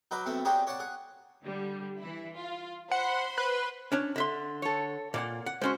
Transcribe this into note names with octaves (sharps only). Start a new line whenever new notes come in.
F#3 D#4 B4 D6
F#2 A3 B3 C4
C4 D4 D#4 G4 G#4 C#5
C#5 D5 F#5 A5 C#6
G#4 F#5
D3 G3
E3 E4
F4
C5 F#5 B5 C6
B4
C#4 D4 C#5
D3 E5 C6
A4 C#5
A#2 A#3 D5 F#5
F#5
G#3 C#4 F#4 C5 C6